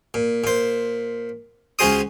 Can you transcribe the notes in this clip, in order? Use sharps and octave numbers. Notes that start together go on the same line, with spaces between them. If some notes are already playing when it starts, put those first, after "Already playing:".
A#2
A#2 C5
C#2 F4 F#4 G#4 C5 D#6